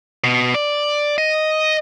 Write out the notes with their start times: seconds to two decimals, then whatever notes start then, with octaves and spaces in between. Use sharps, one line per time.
0.24 B2
0.55 D5
1.18 D#5